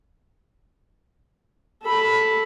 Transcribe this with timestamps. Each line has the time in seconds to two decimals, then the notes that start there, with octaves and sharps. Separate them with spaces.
1.82 A4 B5